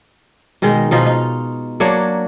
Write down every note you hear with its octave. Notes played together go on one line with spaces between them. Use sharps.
B2 D#3 G#3 D#4
B2 F3 D#4 F4
D#4
F#3 A#3 D4 C#5